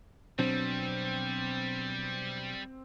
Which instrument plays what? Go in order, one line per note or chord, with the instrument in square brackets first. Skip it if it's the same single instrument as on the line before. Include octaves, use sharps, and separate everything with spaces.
[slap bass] B2 F#3 D4 [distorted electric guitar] G3 [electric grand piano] C4